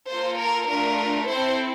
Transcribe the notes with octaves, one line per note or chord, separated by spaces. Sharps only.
A#3 F4 A4 C5
A#4
A3 D4 F4 A#4
C4 E4 A4 C5